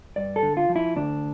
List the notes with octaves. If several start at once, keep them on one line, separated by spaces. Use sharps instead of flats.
G2 D5
A4
D3
F4
F3
E4
D2 D4